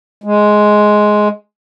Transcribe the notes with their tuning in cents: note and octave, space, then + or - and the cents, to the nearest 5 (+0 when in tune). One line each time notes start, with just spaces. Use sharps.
G#3 +10